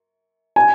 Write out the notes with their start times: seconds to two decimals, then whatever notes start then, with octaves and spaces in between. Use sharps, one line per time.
0.56 G#5